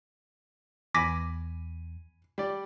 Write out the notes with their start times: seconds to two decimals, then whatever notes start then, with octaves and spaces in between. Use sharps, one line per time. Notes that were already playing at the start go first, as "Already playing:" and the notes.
0.95 E2 G#5 B5 D6 A#6 B6
2.38 G3 D5